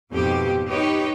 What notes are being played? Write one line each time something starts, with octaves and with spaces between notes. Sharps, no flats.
F2 G#2 B2 G4
D#4 G4 B4 C#5 D#5